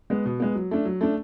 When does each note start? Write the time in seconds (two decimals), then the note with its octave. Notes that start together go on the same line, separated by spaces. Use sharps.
0.10 G#3 B3
0.25 B2
0.40 G#3 B3
0.55 F#3
0.71 A3 D4
0.85 F#3
1.01 A3 D4